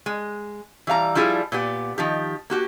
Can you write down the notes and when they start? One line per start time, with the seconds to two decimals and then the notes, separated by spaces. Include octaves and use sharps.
0.06 G#3
0.87 E3 G3 F5 A#5
1.15 F3 G3 E4 F4 G#4
1.52 A#2 B3 G4
1.98 D#3 F3 G4
2.50 A#3 F#4 G4